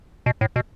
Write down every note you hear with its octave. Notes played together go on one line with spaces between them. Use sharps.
B2
A2
B2